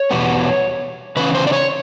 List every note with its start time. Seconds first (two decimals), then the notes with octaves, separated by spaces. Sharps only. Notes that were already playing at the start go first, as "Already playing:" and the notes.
Already playing: C#5
0.11 E2 B2 G3 B3
1.17 C#3 E3 C#4 B4
1.35 C5
1.47 D5
1.52 C#5